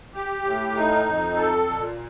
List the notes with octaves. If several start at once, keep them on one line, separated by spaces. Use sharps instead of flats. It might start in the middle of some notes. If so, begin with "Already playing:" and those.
G4
A2
D#4
F2
A4
A#2